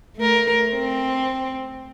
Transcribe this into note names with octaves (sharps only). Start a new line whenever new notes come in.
A3 A#4
C4